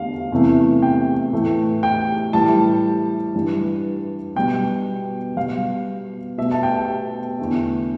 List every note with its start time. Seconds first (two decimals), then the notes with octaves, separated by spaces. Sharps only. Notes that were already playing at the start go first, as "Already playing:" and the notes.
Already playing: E2 D3 A3 F5
0.32 E2 C3 E3 A3
0.82 G5
1.33 A2 E3 A3
1.83 G5
2.33 A2 E3 G3 A5
3.35 G2 E3 G3
4.36 B2 G3 G5
5.37 B2 G3 F5
6.38 B2 A3 E5
6.51 A5
6.63 G5
7.39 E2 D3 A3